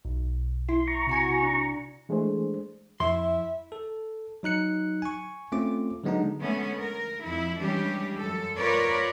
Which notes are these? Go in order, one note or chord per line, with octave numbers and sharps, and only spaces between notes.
B1
E4 C6
A#5 C#6
C3 F#4 G#5
D4
E3 G#3 A3 D4 G#4 C5
F2 E4 E5 C6
A4
F#3 D#4 F#6 C#7
G#5 C#6
A3 C4 C#4 F4 D6
D3 F#3 G#3 B3 D4 D#4
D3 G#3 A3 B3 C#4
A#4
F2 E4
E3 G3 G#3 C#4 D4 G4
F#2 A4
F4 A#4 B4 C#5 D5